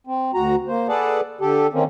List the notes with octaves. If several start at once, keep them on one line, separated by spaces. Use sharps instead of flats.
C4
D2 F#4 A#5
A#3 C5
G#4 A4 B4 D5 F#5 A5
D3 G4 A4
D#3 A#3 C4 C#4